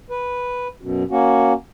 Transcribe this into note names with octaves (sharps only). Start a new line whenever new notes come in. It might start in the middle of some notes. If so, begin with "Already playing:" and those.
B4
F#2 B2
A#3 C#4 F#4